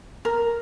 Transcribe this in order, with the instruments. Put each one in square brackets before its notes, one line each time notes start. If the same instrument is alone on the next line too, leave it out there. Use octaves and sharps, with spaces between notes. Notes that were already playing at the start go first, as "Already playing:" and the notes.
[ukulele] A#4